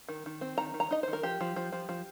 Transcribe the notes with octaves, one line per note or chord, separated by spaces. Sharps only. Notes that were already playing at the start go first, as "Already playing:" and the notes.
D#3
D#3
C4
D#3 A#5
D#3
A#5
D#4 D#5
D#3 C5
A#4
F3 G4
F3
F3
F3
F3